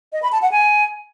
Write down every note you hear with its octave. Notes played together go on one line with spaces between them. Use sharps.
D#5
B5
A5
F#5
G#5